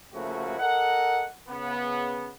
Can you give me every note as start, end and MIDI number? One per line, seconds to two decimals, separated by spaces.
0.13 0.57 49
0.13 0.57 53
0.13 0.57 57
0.13 0.57 58
0.13 0.57 64
0.13 0.57 66
0.59 1.26 69
0.59 1.26 70
0.59 1.26 75
0.59 1.26 78
1.49 2.30 49
1.49 2.30 59